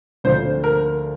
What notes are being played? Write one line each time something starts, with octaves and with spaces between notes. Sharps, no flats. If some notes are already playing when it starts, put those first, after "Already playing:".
D2 D3 F3 C5
A#4